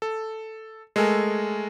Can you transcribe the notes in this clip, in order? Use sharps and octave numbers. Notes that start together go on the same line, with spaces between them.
A4
G#3 A3 A4 A#4 G#5